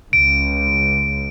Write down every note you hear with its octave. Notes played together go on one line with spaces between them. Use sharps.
C#2 D7